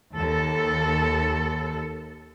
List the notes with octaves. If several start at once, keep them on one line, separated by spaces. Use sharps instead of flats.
D#2 A4